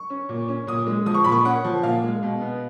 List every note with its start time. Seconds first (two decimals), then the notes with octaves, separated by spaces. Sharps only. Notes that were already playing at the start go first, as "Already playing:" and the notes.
Already playing: C#6
0.10 C#4
0.29 A#2
0.48 C#4
0.67 A#2 D#6
0.86 G#3
1.06 F3 D#6
1.14 C#6
1.24 A#2 B5
1.32 C#6
1.45 C#4 F#5
1.65 F3
1.83 A#2 F5
2.03 G#3
2.23 B2
2.41 B3